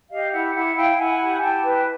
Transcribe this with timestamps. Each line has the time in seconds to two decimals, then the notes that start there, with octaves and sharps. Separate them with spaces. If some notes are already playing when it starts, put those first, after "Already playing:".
0.10 G4 D#5 F5
0.32 E4 E5 F#5
0.54 E4 E5 F#5
0.76 E4 F5 G5
0.97 E4 F#5 G#5
1.20 G4
1.42 E4 G5 A5
1.63 B4